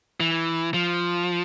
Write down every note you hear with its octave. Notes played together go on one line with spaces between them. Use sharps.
E3
F3